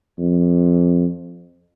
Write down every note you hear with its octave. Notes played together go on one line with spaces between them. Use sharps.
F2